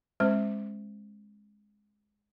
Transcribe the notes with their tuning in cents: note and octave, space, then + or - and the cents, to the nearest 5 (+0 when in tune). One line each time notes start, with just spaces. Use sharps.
G#3 +0 C#4 -45 C5 -20